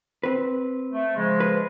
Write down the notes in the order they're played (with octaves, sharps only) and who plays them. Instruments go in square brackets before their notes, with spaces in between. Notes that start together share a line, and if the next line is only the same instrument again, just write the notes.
[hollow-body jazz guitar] C4 B4
[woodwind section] A3
C#3 F3 G#3
[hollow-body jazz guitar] B4